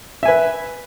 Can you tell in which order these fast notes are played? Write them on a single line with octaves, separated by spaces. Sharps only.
E5 G#5 B4